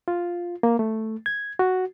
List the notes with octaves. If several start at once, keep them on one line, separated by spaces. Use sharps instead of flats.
F4
A#3
A3
G#6
F#4